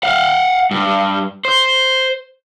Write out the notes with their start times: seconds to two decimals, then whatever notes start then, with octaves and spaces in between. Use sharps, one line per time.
0.03 F5 F#5
0.71 G2
1.45 C5